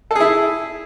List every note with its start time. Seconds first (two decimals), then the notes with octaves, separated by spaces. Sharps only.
0.11 A4
0.15 G#4
0.20 E4